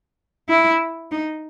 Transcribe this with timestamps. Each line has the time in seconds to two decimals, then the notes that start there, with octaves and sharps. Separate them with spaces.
0.49 E4
1.12 D#4